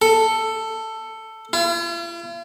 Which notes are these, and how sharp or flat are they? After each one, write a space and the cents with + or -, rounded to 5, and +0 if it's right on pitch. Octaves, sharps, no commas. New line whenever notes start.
A4 +10
F4 -45